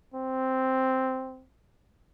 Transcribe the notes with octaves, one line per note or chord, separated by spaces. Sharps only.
C4